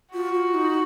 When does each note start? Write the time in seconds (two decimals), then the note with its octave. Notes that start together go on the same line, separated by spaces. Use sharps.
0.14 F4 F#4
0.33 F4
0.54 D#4